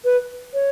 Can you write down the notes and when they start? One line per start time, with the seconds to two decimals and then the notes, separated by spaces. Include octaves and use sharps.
0.05 B4
0.54 C#5